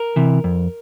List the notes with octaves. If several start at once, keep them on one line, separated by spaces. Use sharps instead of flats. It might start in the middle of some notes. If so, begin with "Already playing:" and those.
Already playing: A#4
C3 E3
F2